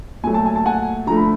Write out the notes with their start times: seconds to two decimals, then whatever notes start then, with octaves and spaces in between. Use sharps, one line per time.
0.24 A#2 F#3 A3 G#5
0.34 A5
0.46 G#5
0.56 A5
0.66 F#5 G#5
1.07 D3 F3 A3 A#5
1.17 B5